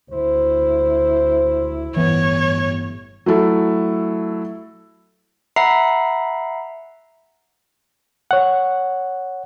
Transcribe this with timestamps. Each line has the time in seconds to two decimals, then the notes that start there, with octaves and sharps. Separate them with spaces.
0.11 D2 E4 C5
1.96 G1 A2 E3 B3 C#5
3.26 F#3 A3 E4 A4
5.56 E5 F#5 A#5 B5 C7
8.31 C#5 F#5